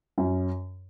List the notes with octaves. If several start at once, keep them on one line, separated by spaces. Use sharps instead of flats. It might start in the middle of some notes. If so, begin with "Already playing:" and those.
F#2